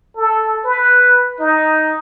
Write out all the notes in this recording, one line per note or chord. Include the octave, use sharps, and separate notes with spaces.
A4
B4
D#4